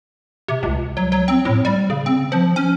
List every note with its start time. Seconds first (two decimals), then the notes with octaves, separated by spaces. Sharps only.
0.48 C3
0.63 C#2
0.97 F#3
1.12 F#3
1.28 C4
1.45 A2
1.65 G3
1.90 C#3
2.06 C4
2.32 F3
2.56 C#4